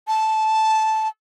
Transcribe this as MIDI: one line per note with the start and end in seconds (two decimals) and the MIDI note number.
0.08 1.08 81